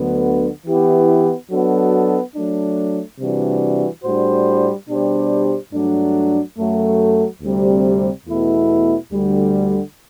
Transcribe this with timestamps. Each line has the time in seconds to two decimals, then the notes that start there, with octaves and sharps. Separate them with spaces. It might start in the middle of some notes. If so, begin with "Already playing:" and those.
Already playing: D2 D3 F#3 B3
0.66 E3 B3 E4 G4
1.51 F#3 B3 D4 F#4 A4
2.34 F#3 A3 D4
3.19 C3 E3 G3 D4 F#4
4.03 A2 G3 D4 F#4 C5
4.88 B2 G3 D4 G4 C5
5.72 G2 F#3 A3 D4
6.58 F#2 F#3 A3
7.42 D2 C3 G3 C4
8.26 E2 B2 A3 E4
9.11 D2 D3 G3